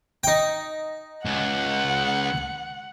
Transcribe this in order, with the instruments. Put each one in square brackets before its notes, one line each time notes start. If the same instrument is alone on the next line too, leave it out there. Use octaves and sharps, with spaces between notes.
[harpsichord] D#4 G5
[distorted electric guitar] C#2 [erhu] F#5